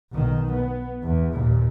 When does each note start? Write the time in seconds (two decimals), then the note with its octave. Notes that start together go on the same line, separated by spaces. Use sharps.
0.13 B1 D#3
0.53 B3
1.03 E2
1.33 D#2 A#2